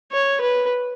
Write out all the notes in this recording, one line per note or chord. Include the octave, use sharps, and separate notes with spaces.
C#5
B4